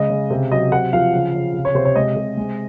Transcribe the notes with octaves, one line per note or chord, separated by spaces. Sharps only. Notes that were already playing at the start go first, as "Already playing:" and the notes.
Already playing: C#3 G#3 D#5
C#3
C3
F#3 D#5
C3 F#5
F3 F5
C#3
C#3
C3
C#5
C3 C5
C#5
G#3 D#5
C3
G#3